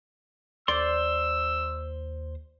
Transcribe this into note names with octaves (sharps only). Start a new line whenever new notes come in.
D#2 C5 D5 C6 E6